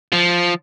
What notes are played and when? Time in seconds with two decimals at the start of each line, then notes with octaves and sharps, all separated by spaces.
0.13 F3